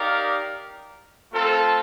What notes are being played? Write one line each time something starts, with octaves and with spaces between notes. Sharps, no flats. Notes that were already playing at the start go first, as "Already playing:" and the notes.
Already playing: D#4 G4 A#4 D5 F5
A3 C4 F4 A4